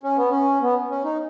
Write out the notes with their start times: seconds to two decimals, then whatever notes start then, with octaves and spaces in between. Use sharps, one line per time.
0.03 C#4
0.16 B3
0.30 C#4
0.62 B3
0.90 C#4
1.04 D#4